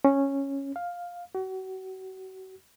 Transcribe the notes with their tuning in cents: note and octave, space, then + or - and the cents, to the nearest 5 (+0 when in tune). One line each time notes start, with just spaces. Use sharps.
C#4 -10
F5 +10
F#4 +35